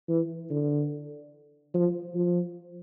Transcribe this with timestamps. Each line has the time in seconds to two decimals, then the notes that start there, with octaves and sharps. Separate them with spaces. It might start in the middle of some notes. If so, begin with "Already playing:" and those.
0.09 E3
0.50 D3
1.74 F3
2.15 F3